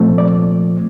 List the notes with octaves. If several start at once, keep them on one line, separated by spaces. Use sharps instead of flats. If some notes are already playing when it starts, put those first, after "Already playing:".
Already playing: C2 A#2 F3 A3 C4
D5